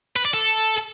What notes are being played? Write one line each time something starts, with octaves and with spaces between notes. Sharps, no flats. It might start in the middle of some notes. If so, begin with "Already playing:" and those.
B4
D5
A4